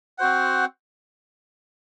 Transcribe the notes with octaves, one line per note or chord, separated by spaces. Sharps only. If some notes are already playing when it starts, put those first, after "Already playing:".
C4 F#4 C5 F#5